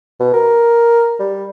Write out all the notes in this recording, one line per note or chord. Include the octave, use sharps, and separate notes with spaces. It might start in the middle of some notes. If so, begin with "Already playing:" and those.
B2
A#4
G3